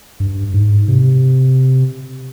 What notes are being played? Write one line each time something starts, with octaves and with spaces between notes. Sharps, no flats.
G2
G#2
C3